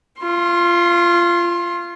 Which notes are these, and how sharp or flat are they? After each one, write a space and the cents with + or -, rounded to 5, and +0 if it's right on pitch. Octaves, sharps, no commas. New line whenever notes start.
F4 -20 C6 +25